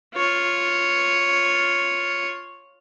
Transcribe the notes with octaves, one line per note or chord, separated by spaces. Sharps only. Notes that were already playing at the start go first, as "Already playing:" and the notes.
F4 C#5